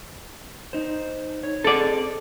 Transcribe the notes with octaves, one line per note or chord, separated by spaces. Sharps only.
D#4 C5
C#5
C4 G#4 A4 D5 D#5